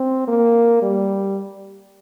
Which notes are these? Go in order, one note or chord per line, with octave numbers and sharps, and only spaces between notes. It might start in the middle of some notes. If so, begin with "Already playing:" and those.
Already playing: C4
A#3
G3